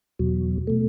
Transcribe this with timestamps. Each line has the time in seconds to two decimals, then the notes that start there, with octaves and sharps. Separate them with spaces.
0.19 E2 B2 F#3
0.67 B2 A3